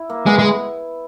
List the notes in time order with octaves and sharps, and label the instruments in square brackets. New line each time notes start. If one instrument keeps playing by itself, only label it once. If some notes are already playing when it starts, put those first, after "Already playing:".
Already playing: [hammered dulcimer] E4
A#3
[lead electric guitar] G#3 [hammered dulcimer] B3
[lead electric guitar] G#3